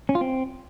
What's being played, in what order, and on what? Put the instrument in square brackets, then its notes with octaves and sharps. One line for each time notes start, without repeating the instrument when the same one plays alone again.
[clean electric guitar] C#4
F4
C4